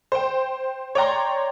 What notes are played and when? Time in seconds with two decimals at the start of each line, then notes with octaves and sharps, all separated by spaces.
0.12 C5 G5
0.95 C#5 D5 G5 A#5 C6